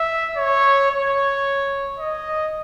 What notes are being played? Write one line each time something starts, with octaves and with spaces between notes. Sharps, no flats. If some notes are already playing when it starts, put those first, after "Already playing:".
Already playing: E5
C#5
C#5
D#5